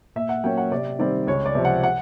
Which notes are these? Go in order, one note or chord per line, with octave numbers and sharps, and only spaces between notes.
A#2 E5
F#5
F#3 A#3 C#4 G5
F#5
C3 D5
D#3 G3 C4 D5
C#2 C#5
D5
C3 F3
F#5
F#5